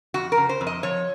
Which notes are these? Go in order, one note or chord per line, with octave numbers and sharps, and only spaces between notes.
F2 F#4
A#4
C#3
C5
F2
D#5
F3 C#5